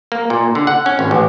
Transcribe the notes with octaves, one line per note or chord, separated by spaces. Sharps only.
A#3
A#2
D3
F#5
C#4
G#1
A1